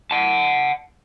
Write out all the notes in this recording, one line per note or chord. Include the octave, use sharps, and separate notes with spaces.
F#5 A5